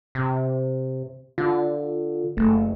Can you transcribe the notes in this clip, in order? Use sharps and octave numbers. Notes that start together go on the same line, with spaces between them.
C3
D3 F4
F#1 A3